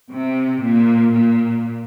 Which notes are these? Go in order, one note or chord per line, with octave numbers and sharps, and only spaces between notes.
C3
A#2
A#2